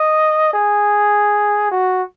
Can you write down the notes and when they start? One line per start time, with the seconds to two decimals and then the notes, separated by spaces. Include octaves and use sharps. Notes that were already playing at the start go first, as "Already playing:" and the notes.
Already playing: D#5
0.54 G#4
1.72 F#4